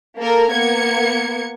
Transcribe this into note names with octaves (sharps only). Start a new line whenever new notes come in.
A#3 A4 A#4
A#3 B3 G#6 C#7